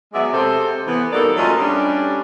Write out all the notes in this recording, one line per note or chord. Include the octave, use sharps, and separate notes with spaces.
F#3 G#3 B3 D5 E5
C3 A4 C5
E3 B3
G3 A#3 D#4 F#4 A4 D5
F#2 F#3 A3 C#4 F4 D#5
G3 C#4 D4